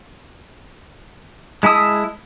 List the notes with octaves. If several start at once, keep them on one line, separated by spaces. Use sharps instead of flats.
G#3 E4 A5 D#6 E6